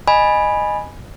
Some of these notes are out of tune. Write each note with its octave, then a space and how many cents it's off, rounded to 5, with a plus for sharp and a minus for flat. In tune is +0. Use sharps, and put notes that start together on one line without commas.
D#5 -15 G#5 +0 B5 -5